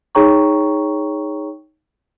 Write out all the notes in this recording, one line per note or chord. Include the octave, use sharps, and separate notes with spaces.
D#4 G#4 C#5 G5 A#5 C#6